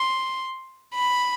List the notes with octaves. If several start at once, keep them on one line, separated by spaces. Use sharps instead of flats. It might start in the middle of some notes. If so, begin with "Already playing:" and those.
Already playing: C6
B5